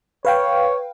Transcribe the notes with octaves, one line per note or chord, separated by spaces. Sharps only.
B4 C#5 F5 G5